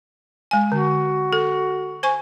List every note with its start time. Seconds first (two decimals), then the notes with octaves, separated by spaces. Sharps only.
0.51 G#3 G#5
0.72 D3 F#4
1.33 A4
2.03 C5 G#5 C#6